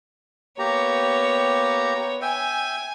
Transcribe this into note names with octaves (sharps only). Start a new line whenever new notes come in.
A#3 B3 G4 C#5 A#5
E5 G5 G#5